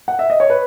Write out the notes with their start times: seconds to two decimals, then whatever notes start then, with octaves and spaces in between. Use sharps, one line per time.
0.08 F#5
0.19 E5
0.30 D#5
0.40 C#5
0.50 B4